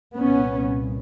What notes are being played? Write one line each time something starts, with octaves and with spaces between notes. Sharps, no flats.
C2 A#2 B3 C#4